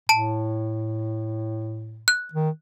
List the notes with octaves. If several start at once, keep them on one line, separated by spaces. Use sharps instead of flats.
A2 A5 D7
F#6
D#3